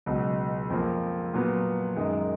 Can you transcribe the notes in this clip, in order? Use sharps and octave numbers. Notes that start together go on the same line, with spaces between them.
C#2 B2 F#3
F2 F3 A#3
A#2 F#3 B3
F#2 D#3 G#3